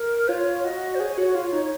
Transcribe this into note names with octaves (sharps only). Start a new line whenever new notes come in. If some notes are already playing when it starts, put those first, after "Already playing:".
Already playing: A#4
F4 C#5
F#4 D#5
C5
G#4 C#5
F#4
F4 C#5
D#4